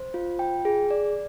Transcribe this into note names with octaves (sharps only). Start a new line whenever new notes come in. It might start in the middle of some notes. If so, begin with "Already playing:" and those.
Already playing: C5
F4
G5
G#4
D5